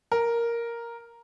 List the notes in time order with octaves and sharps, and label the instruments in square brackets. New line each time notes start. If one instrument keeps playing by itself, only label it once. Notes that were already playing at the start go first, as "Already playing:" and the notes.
[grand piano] A#4